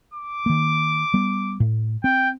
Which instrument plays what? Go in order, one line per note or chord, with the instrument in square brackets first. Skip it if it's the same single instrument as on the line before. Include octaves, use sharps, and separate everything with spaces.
[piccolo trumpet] D6
[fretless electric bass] D#3 A#3
G3 B3
A2
[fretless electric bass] C4 [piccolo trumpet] G5